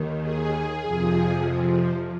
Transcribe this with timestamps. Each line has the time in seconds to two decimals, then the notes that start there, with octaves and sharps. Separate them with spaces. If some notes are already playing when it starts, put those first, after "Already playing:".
Already playing: D#2 D#3
0.20 G#4
0.84 F2 C3 F3